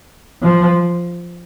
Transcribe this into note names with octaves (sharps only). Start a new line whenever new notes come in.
F3